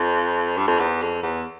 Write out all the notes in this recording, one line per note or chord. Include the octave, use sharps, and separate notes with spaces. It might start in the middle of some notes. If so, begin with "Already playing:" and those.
Already playing: F2
G2
F2
E2
F2
E2